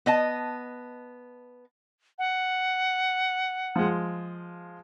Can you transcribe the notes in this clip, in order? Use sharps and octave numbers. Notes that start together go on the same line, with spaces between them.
B3 D#5 A5
F#5
F3 G#3